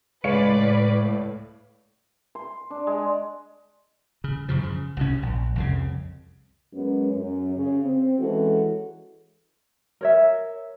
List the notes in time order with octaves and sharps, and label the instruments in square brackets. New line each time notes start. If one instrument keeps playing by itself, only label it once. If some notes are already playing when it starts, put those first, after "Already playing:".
[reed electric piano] C#2 G#3 [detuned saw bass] A2 [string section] B4 D5 [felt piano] C#5 F5 C#7
[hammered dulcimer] C6
D4
G#3
[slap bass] C#3
F#2 C#3 F3
C#3
C2 B2 C#4
A#1
C2 F2 C#3
[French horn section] F#2 G#3 B3 C#4
F#2
C#3
C4
E3 G#3 C#4 F#4 A4
[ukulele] A#4 C#5 E5